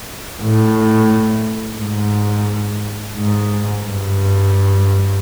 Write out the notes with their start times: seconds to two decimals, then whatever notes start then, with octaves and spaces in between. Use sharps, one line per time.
0.42 A2
1.80 G#2
3.17 G#2
3.86 G2